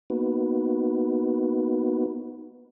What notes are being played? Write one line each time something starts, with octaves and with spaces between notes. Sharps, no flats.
A#3 B3 D#4 F#4 B4